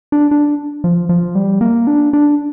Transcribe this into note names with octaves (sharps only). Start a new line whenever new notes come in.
D4
D4
F3
F3
G3
A#3
D4
D4